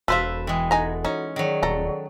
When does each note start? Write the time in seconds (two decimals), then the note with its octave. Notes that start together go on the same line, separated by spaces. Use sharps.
0.08 E1 F#4 A4 B4 C5 E5 F5
0.47 E3 G#3 G5
0.71 D#4 F#4 A4 F#5 G#5 A#5
1.05 C#4 D#4
1.36 D#3 F#3 G#4 D5
1.63 D#1 A4 A#5